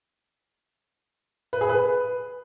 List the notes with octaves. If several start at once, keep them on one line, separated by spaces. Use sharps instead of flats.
B4
G#4
B4